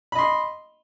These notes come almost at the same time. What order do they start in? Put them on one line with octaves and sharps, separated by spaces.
B5 D#5 C6